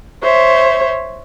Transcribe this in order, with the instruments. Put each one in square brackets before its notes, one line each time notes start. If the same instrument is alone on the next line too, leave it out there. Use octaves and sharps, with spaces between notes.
[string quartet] C5 C#5 E5